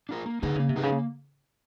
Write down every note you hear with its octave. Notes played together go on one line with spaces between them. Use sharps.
D4 F4 A#4
A#3
D3 D#4 G#4 B4 D#5
C#3 A#3
C3
D#4 G#4 B4 D#5
C#3
A#3